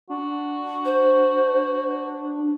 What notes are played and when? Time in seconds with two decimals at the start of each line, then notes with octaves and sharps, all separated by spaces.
0.10 D4 F#4
0.85 C5